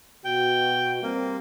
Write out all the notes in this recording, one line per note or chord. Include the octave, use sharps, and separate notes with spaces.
B2 F#4 G5
G3 A#3 C4